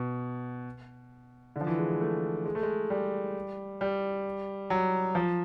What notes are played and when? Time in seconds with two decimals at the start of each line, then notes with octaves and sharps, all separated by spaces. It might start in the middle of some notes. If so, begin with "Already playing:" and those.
Already playing: B2
1.56 D3
1.61 F3
1.67 E3
1.78 G#3
1.89 G#3
2.01 A3
2.46 G#3
2.55 A3
2.63 G#3
2.90 G3
3.81 G3
4.70 F#3
5.15 F3